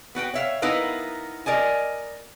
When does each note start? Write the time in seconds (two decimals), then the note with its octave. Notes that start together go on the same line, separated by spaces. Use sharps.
0.15 B3 F#4 B4 G5
0.34 C#5 E5 F5
0.62 B3 D#4 E4 A#4 B4 F5
1.46 A#4 D5 D#5 G#5